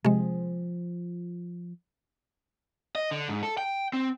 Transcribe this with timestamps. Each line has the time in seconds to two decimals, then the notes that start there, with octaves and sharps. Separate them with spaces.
0.05 C3 F3 G#3
2.95 D#5
3.11 D3
3.29 G#2
3.43 A4
3.58 G5
3.93 C4